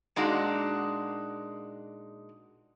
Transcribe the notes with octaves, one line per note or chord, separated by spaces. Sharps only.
A#2 G#3 D4 D#4 F#4